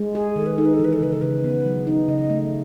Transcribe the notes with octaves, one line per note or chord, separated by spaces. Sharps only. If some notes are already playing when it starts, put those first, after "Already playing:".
Already playing: G#3
G#4
D#3 A4
B4
D#4 A4
B4
A4
E3
B4
A4
C#3 B4
A4
C#3 B4
B3
F#3
D#4
C#3 D#5
A3